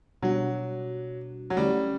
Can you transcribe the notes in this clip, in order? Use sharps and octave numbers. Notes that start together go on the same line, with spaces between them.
B2 F#3 G3 D4 F#4
F#3
D3 G3 A3 C#4 E4